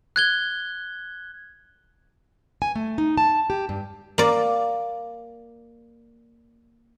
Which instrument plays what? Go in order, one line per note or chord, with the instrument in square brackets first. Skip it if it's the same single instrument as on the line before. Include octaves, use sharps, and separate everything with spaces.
[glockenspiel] F#6 G#6 G7
[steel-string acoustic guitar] G#5
A3
D#4
A5
G4
G2
[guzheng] A#3 D5